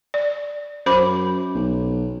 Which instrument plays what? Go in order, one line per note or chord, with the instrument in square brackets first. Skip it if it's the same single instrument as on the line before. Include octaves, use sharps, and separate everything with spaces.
[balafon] D5
[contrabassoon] F#2 [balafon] C5 B5 D6
[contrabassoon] B1